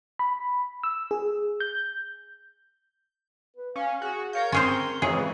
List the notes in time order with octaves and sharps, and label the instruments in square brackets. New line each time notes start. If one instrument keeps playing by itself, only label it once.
[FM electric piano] B5
E6
G#4
G6
[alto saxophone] B4
[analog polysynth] C#4 [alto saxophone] F5
[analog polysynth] F#4 [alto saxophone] G#4
[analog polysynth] A#4 C#5 G6 [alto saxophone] F5
[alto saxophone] C4 [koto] C#4 G#4 C5
[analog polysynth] F2 C#3 E3 [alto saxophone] G#3 [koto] G#4